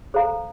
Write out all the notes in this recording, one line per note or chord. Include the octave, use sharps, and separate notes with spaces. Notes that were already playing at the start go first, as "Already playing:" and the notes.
A4 C5 F5 A#5